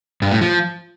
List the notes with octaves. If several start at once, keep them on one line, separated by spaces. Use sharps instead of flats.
G2
A2
F3